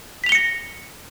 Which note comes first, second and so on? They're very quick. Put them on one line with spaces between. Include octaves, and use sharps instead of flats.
B6 F7 G7 C#7 A#6